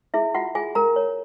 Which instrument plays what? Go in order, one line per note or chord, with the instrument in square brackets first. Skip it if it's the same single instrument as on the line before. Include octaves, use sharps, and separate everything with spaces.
[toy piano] E4 G#4 E5
F4 F#4 F#5
F4 G#4 G#5
A#4 A#5
C#5